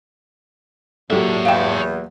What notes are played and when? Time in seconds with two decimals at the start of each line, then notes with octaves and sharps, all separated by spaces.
1.10 E2 A#2 F#3 D4 G4 A4 C#5 E5
1.45 E2 F5 G5